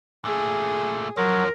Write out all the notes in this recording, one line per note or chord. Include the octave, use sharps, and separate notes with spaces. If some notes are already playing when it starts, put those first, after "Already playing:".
A#2 A3 G#4
F#2 F3 F#3 A#4